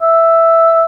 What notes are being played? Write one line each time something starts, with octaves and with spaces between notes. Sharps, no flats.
E5